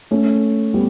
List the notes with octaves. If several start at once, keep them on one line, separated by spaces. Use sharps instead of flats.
A3 C#4
G3 B3